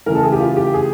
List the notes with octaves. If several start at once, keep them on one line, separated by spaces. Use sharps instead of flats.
C#3 E3 A3 A#4
A4
G#4
G4
F4
G4
G#4